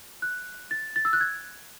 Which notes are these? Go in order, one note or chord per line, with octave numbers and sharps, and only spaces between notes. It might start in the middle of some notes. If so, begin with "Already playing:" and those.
F#6
A6
A6
E6
F#6
G#6